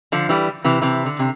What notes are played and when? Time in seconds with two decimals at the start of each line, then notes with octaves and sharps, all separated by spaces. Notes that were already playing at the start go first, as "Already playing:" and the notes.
0.12 D3 F3
0.29 E3 G3
0.64 C3 E3
0.82 C3 E3
1.06 D3
1.19 C3